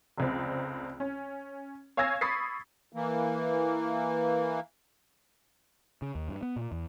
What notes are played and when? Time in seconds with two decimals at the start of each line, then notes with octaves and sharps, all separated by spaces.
0.18 F1 C#2 C4
1.00 C#4
1.97 C#5 F5 G#5 E6 G#6 A#6
2.21 B5 C#6 D#6 A6 B6 C7
2.92 E3 A#3
6.02 C#3
6.15 D#2
6.28 G2
6.43 B3
6.56 A#2
6.72 E2